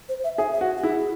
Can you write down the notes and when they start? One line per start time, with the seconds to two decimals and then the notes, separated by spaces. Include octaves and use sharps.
0.09 C5
0.24 E5
0.38 G#4 E5
0.53 E5
0.61 F#4
0.78 F#4
0.83 E4 G#4